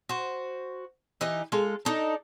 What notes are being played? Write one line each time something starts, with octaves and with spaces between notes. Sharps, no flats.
F#4 C5
E3 D#4 G4 D#5
G#3 F4 A4
D4 D#4 A4